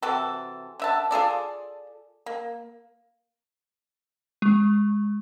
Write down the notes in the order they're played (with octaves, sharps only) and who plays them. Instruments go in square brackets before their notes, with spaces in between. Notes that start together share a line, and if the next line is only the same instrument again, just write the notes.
[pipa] C3 E3 F#4 A4
D3 E5 A5
F4 G#4 A4 D5
A#3
[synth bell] G#3